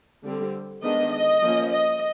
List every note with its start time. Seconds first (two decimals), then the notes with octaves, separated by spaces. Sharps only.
0.24 D3 G3 C4
0.83 D#3 G#3 B3 D4 D#5
1.12 D#5
1.42 F3 A#3 C#4
1.72 D#5